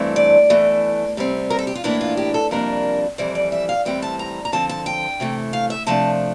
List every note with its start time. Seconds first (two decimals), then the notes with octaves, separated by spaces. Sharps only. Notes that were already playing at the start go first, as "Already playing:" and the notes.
Already playing: G2 E3 A3 C4
0.16 D5
0.50 E2 E3 A3
1.17 C3 G3 C4
1.50 A#4
1.59 A4
1.67 G4
1.75 F4
1.84 A2 E3 A#3 D4 E4
2.01 F4
2.17 G4
2.34 A4
2.51 F2 C3 G3 A#3 D4 A#4
3.18 F2 E3 G3 C5
3.35 D5
3.52 E5
3.69 F5
3.85 A2 E3 G3 C4 G5
4.02 A5
4.19 A#5
4.45 A#5
4.52 D3 F3 C4 A5
4.69 A5
4.86 G5
5.20 C3 E3 A3
5.53 F5
5.70 E5
5.87 C3 F3 A3 D4 A5